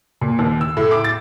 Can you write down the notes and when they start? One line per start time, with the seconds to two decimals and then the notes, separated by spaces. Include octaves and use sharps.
0.21 A#2
0.39 D#2
0.61 E6
0.77 A2
0.91 D6
1.04 A6